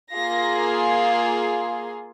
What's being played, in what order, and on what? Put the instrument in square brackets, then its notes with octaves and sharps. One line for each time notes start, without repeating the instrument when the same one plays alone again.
[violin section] A#3 F4 G#4 A#6